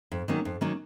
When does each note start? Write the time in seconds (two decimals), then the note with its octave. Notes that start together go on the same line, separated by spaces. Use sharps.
0.12 F2
0.28 D#3 F#3 A#3 C#4
0.45 F2
0.61 D#3 F#3 A#3 C#4